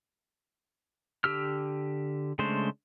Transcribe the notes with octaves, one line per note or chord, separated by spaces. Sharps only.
D3 G4 E6 F6
C#3 G#3 A3 D4 C5